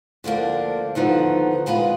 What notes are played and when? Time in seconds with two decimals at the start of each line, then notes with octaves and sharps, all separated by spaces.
0.24 D2 D3 F3 A#3 D4
0.95 D#2 D3 F3 B3 D#4
1.66 A#2 G#3 B3 F4 B4